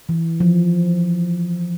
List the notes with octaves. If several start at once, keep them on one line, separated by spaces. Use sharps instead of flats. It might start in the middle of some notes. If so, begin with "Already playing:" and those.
E3
F3